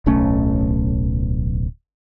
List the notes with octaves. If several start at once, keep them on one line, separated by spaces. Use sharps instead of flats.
D1 B1 A3 C#4